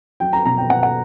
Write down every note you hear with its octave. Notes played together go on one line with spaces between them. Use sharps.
F#3 G5
A#5
B2 A#5
G5
B2 F#5
F#5